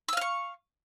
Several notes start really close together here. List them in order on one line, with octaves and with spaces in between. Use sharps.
E6 F5 F6 C#6